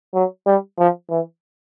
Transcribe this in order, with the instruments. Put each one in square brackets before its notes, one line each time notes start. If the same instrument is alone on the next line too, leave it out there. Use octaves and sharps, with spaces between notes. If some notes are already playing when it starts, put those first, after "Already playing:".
[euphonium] F#3
G3
F3
E3